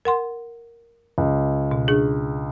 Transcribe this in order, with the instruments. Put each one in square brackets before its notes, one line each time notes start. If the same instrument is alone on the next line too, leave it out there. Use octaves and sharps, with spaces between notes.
[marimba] A#4 F#5 C6
[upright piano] C#2
[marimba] B2
D4 G#4